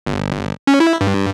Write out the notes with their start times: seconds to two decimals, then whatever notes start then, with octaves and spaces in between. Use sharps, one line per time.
0.07 G1
0.67 C#4
0.80 E4
1.01 G2